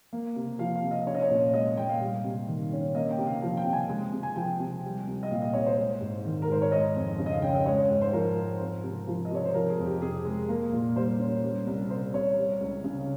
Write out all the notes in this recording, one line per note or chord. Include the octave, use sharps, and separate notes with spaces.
A#3
C3
F3 F5
F5
C3
D#5
C#4 C#5
D#5
C#5
A#2
G#3 D#5
A#2 G5
F5
G3
C3
D#3
C#4
A#3 D#5
G5
C3
F5
F3 F5
G5
C3
G#5
G#3
C3
G#5
F3 G5
C3
G3
C2
D#5
A#2 F5
D#5
C2 C#5
C5
G#3
G#2
D#3
A#4
G#2 C5
C#5
G#3 D#5
F2
C#3
D#5
F5
C#4 G5
D#5
G#3 C#5
G#2
C5
F3 A#4
G#2
C4
C3
F3
D#5
C3 C#5
C5
F3 A#4
G#4
F2
G4
C3 G#4
G#3
A#3 A#4
A#2
G3 C5
C#4
G3
C2
C3 C5
C2 C#5
G3
C#2
C#3